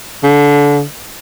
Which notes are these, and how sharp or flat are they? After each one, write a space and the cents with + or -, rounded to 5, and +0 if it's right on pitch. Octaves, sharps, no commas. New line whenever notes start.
D3 -25